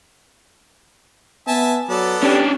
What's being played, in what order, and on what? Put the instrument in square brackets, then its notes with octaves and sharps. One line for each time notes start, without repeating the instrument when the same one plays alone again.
[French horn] B3 [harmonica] E5 G#5 A5
[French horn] F#3 [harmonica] B3 A4 D5
[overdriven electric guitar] C#4 D4 [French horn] G4